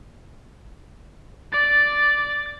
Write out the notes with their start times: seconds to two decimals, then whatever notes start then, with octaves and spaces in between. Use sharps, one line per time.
1.53 D5 A6